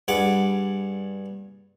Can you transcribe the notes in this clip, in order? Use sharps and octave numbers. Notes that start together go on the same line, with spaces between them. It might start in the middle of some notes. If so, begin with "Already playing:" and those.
G2 G#4 F#5 B5 D6